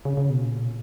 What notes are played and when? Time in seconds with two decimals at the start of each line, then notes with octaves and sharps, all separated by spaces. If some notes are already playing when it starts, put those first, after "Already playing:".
0.05 C#3
0.17 C#3
0.30 B2
0.44 A#2